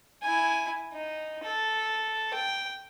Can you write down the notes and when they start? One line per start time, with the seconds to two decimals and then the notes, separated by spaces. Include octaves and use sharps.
0.22 E4 G#5
0.93 D#4
1.44 A4
2.34 G5